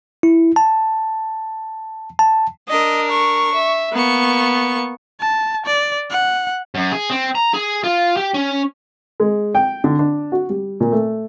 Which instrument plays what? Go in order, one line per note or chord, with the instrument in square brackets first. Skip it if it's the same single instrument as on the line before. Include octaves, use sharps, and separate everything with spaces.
[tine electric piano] E4
A5
A5
[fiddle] D4 A#4 [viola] D#5
[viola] C#6
[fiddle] E5
[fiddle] A#3 C#6 [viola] B3
[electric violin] A5
D5
F#5
[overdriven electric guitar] F#2
G#4
C4
A#5
G#4
F4
G4
C#4
[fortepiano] G#3
G5
D3
D4
F#4
G3
A#2
A3